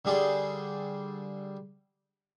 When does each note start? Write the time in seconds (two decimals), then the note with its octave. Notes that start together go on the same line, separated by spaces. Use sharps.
0.05 D3 G3 G#4 D5 C6